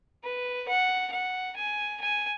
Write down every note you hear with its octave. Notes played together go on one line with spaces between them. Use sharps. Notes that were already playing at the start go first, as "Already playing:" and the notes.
B4
F#5
F#5
G#5
G#5